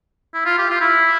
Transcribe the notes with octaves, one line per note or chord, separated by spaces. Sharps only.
E4
F4
G4
F4
E4